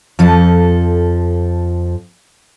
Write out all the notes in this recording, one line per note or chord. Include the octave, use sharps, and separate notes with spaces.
F2 F3 A4